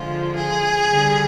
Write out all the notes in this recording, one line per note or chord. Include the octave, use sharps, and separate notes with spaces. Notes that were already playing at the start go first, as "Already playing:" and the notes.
Already playing: D3 F3 G#3 F4
G#4
D3 G3